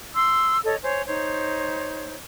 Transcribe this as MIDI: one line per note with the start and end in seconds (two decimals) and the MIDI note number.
0.15 0.57 84
0.15 0.57 88
0.64 0.75 69
0.64 0.75 73
0.64 0.75 75
0.82 1.02 72
0.82 1.02 73
0.82 1.02 80
1.05 2.15 63
1.05 2.15 72
1.05 2.15 73